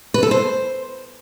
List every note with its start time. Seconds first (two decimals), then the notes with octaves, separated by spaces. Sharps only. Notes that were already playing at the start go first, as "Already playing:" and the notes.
0.14 B4
0.23 A4
0.31 C5